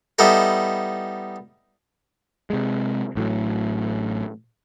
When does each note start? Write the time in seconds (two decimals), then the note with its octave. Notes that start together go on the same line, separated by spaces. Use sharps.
0.19 G3 B3 D#4 E4 A4
2.50 C3 G#3
3.15 A1 A2 F#3